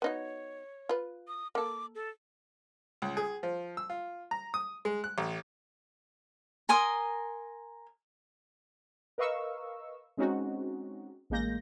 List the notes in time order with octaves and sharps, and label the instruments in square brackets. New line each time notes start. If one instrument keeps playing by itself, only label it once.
[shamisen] B3 D#4 F#4 [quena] C#5
[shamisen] F4 B4
[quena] D#6
[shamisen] A#3 A4 [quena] D6
[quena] A4
[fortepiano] C#2
G#4
F3
E6
F4
A#5
D#6
G#3
F#6
A1
[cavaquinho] A#4 G#5 C6 D#6
[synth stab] A#4 B4 D#5 F5 C#6 E6
G#3 C4 C#4 D#4 F#4
A1 G#3 A#3 G6 A#6